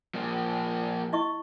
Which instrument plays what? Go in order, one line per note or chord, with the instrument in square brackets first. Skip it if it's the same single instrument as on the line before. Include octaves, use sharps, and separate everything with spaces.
[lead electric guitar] F3 A#3
[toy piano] E4 D#5 C#6